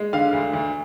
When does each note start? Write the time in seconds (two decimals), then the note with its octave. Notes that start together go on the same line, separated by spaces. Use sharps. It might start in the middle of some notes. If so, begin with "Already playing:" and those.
Already playing: G#3
0.13 D3 F5
0.33 D2
0.53 D2